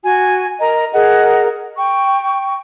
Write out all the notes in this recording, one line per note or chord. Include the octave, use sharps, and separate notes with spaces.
F#4 G#5
A#4 D#5 A#5
G#4 A#4 D#5 F#5
G5 C#6